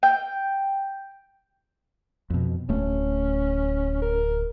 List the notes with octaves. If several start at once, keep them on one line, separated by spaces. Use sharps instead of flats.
G5
F2 B2
D1 A3 C#4
A#4